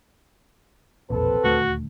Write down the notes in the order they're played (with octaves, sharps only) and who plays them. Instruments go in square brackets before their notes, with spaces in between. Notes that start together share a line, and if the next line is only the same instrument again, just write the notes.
[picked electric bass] E1 A#1 F2 [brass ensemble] C4 A4 B4
[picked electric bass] D#1 D2 A3 [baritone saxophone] F#4